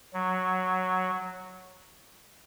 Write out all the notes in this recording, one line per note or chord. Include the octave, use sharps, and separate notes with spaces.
F#3